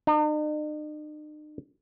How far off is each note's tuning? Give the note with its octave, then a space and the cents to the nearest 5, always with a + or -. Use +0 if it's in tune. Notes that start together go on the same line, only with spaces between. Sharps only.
D#4 -45